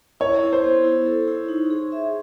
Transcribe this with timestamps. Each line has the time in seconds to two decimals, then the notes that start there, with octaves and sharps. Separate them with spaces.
0.20 E4 C#5
0.43 E4
0.53 C5
0.64 B3
0.84 E4
1.06 A4
1.28 E4
1.48 D#4
1.70 G#4
1.92 E5